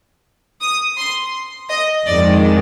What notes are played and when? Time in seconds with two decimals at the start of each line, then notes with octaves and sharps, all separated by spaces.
0.62 D#6
0.98 C6
1.70 D#5
2.06 F2 D#3 G#3 D5